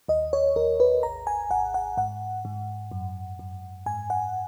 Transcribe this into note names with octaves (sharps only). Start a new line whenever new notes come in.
D#2 D#5
C#5
D#2 A#4
B4
G#1 A#5
G#5
G#1 F#5
F#5
G#2 F#5
G#2
F#2
F#2
G#2 G#5
F#5